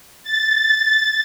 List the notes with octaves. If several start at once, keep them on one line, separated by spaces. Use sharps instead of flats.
A6